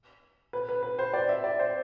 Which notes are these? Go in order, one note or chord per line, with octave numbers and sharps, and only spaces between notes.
B4
B4
B4
C5
D5
E5
D5
C5